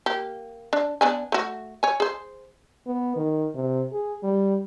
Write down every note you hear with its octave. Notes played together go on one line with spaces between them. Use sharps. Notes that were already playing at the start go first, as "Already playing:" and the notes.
A#3 G4
D4
B3 D4 G#5
A3 F#4
C#5 G#5
G#4 C5
B3
D#3
C3
G#4
G3